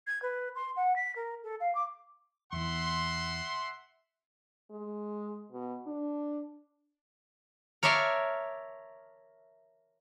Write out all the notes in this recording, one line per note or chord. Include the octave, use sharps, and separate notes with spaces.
G#6
B4
C6
F#5
B6
A#4
A4
F5
D6
E2 E3 E5 F#5 C6
G#3
B2
D4
A#4 C#5 D5 E5 A5 C6